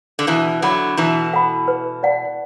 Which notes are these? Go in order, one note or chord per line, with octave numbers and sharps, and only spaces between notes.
D3
B2 E3 E4
D3 F#3 A4 F#5 B5
B2 E3 E4
A4 F#5 B5
B4
D5 F#5 A5